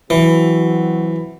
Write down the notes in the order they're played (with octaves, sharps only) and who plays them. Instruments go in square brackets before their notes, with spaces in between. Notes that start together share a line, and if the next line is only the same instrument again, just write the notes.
[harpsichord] E3 [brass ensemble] F#3 C4 F#4